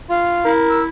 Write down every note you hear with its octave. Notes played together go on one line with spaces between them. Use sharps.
F4 F5
E4 A#4
E6